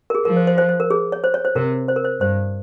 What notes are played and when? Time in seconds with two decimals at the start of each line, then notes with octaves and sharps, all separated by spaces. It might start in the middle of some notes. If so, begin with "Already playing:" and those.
0.10 A#4
0.15 G#4
0.25 F3 A#4
0.36 C5
0.47 C5
0.58 C5
0.69 C5
0.80 A#4
0.90 G#4
1.12 C#5
1.24 C5
1.34 C#5
1.45 C5
1.55 C3 A#4
1.88 C5
1.96 A#4
2.05 C5
2.20 G2 C5